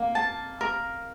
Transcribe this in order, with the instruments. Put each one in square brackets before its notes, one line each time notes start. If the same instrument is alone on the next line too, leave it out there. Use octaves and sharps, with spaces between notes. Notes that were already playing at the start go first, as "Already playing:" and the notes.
Already playing: [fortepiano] A#3
[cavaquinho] A5
A#4